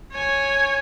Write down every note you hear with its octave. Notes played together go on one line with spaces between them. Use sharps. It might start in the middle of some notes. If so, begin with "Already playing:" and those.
C#5 G#5